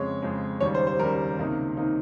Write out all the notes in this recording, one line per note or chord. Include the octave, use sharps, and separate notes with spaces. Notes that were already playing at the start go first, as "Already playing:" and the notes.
Already playing: F2 C#3 G#3 C#5
F2 C#3 G#3
D#2 C#3 G3 C#5
C5
C5
D#2 C#3 G3 A#4
C#2 C3 D#3 A#3 D#4
C3 D#3 A#3 D#4